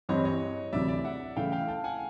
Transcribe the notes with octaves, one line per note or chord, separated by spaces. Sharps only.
G2 E3 G3 C4 C#5 D#5
C#5 D#5
D2 C3 E3 D5 E5
D5 E5
E5 F#5
C#3 E3 A3 F5 G5
F5 G5
G5 A5
F#5 G#5